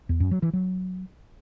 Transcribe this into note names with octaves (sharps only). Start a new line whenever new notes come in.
E2
F#2
F#3
E3
F#3